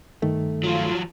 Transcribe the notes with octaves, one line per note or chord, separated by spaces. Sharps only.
G2 D#3 A3
F3 F#3 F4